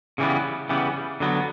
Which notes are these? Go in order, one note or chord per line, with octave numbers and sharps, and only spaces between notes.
C#3 E3 G3 B3
C#3 E3 G3 B3
D3 F#3 B3